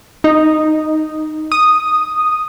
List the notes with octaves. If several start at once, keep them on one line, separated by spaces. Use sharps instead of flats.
D#4
D#6